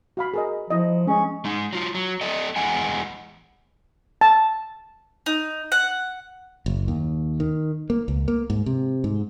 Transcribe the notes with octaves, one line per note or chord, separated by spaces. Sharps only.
F#4 F5 B5
G#4 A#4 D#5
F3 E4 D#5
G#3 C#4 G#4 D#5
G#3 D#4
F#3 F4
F#3
A4 D5 D#5
E2 G#3 F#5 G#5
A5
D#4
F#5
F#1
D#2
D#3
A#3
C#2
A#3
G#2
C3
G#2